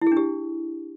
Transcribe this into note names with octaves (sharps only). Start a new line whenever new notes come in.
E4
G#4
D4
G4